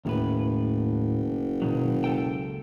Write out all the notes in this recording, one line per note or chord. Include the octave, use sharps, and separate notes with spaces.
F#1 D#2 A2 B4
B2 D#3 F#3
C#2 A4 G5